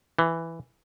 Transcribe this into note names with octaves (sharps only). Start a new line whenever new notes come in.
E3